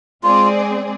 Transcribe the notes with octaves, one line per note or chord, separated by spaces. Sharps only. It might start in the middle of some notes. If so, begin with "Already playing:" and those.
G#3 C4 F4 G#4 D5